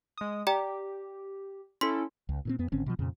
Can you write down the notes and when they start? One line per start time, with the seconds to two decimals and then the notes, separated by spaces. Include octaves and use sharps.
0.18 G#3 D#6
0.47 G4 D5 G5 A#5
1.81 C#4 E4 A4 C6 B6
2.29 C#2
2.45 A#2 C#3 C4
2.59 F2 B3
2.72 G#1 D3 C4 C#4
2.86 B2 D3 F3
2.99 F2 A#2 C#3